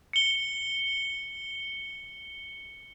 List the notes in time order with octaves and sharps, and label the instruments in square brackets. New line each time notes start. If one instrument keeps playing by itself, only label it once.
[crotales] C#7 G7